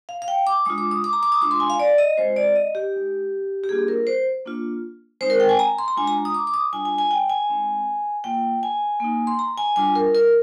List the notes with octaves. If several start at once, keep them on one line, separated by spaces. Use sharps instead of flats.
F5
F5
G5
D6
G#3 D4 F4 D#6
D6
D#6
D6
A#5
D6
D#6
G#3 D4 F4 D6
C6
G#5
F5
D5
D#5
G#3 C4 F4 C5
D5
D#5
G4
G#3 D#4
G4
G3 A#3 D4 F4 G#4
A#4
C5
A#3 D4 F4
G#3 C4 D#4 C5
A#4
G5
G#5
A#5
C6
A#5
G#3 D4 F4 G#5
A#5
D#6
D6
D6
D#6
G3 D4 F4 G#5
G#5
G#5
G5
G#5
G#3 C4 D#4
A#3 F4 G5
G#5
A#3 D#4
C6
A#5
G#5
G3 D4 F4 G#5
A#4
A#4